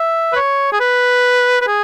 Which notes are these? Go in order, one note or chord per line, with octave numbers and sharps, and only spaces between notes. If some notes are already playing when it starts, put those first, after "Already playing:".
Already playing: E5
B4
C#5
G#4
B4
B4
G#4